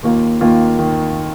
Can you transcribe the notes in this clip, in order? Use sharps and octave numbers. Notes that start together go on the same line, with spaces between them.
D#2 D#3 A#3 F4
D#2 D#3 A#3 F4
D#3